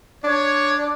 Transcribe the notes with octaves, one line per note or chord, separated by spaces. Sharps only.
D4 C#5